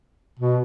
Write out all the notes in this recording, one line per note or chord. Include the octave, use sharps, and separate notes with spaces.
B2